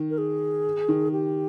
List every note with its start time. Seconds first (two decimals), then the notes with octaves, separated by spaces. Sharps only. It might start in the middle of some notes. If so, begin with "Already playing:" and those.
Already playing: D#3
0.10 A#4
0.18 G#4
0.89 D#3
1.12 G4